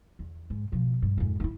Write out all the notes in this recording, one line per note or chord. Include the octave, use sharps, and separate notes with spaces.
E2
G#2
B2 F3
G2
F2 G#2
C4 E4